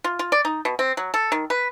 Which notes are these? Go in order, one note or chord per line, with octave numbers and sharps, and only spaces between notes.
F4
F4
D5
D#4
B2
C4
F#3
A4
D#3
B4